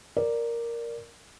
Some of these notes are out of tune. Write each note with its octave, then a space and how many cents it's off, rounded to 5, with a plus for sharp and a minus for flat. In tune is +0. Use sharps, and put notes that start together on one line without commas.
A#4 +0 D5 +0